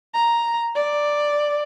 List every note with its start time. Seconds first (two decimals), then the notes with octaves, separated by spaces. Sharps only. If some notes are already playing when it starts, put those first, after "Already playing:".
0.14 A#5
0.75 D5